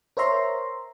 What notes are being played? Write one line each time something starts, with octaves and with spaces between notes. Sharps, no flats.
A#4 C5 C#5 E5 A#5 C6